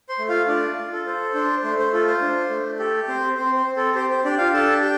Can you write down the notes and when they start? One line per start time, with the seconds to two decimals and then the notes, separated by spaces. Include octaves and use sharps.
0.09 C5 C6
0.19 A3
0.28 F4 F5
0.48 D4 F4 D5
0.76 F4
0.93 A4
1.06 A4 C5
1.34 D4 C5
1.64 A3 C5
1.79 C5
1.93 F4 A4
2.07 C5
2.21 D4
2.50 A3
2.79 G4 A4
3.08 C4 C5
3.37 C4 C5
3.57 C5
3.66 C4
3.77 A4
3.95 G4 C5
4.10 C5
4.24 D4 G4 D5
4.38 F4 F5
4.53 D4 A4 A5
4.82 G4 G5